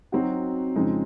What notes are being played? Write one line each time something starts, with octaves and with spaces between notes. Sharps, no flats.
F#3 C4 D#4 F#4
F2 C#3 G#3 C4 D#4